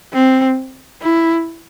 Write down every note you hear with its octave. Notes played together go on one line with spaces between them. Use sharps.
C4
E4